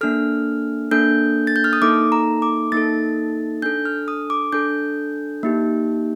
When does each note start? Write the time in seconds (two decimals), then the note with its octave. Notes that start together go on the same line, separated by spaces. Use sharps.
0.01 A#3 D4 A4 F6
0.91 A#3 D4 A4 G6
1.47 A6
1.56 G6
1.64 F6
1.73 D#6
1.82 A#3 D#4 A4 D6
2.12 A#5
2.42 D6
2.72 A#3 D#4 A4 A6
3.62 D4 A4 G6
3.85 F6
4.08 D#6
4.30 D6
4.52 D4 A4 G6
5.43 A#3 D#4 G4